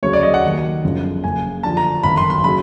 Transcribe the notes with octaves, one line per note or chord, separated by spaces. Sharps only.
D2 C#3 F#3 C#5
D5
D#5
F#5
D#2 D#3 F#3
G1 F#2 C#3 F3
F#1 F#2 C#3 G#5
D#2 D3 F3 A5
A#5
G1 F#2 D#3 B5
C6
C6
C#3 F#3 B5